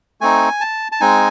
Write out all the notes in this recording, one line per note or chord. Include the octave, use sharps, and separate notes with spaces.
A3 C4 D#4 G#5
A5
A5
G#3 C4 D#4 G#5